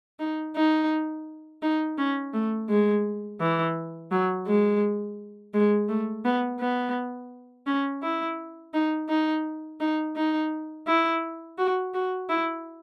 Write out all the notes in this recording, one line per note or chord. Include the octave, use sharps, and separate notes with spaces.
D#4
D#4
D#4
C#4
A3
G#3
E3
F#3
G#3
G#3
A3
B3
B3
C#4
E4
D#4
D#4
D#4
D#4
E4
F#4
F#4
E4